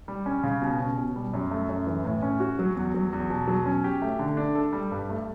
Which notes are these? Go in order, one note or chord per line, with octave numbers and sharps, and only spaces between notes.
G3
C#4
C#3
B2
C#4
B2
G3
F#2
A3
F#2
E3
A2
C#4
F#4
F#3
E2
F#3
E2
B2
F#3
C#4
G4
A3
D3
D4
A4
G3
G2
A3